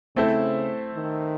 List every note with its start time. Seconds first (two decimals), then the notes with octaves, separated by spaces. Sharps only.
0.16 C#3 A3 C4 E4 A4 C5
0.94 D#3